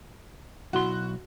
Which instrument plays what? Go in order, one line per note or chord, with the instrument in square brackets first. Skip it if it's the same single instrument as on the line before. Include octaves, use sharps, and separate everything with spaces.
[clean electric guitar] B1 E4 C6 [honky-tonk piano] F#4